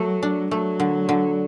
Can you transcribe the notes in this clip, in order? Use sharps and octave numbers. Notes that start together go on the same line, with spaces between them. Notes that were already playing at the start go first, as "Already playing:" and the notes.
Already playing: F#3 A3
D4
F#3 A3
D3
D3